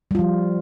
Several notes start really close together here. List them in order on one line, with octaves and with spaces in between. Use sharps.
G3 F4 F3